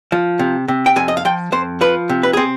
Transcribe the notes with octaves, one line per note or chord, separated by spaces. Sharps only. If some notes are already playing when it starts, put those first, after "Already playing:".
F3
C3
C3
G5
F2 G#5
D#5
F5
F3 G5
F2 C5
F3 B4
C3
B4
C4 G#4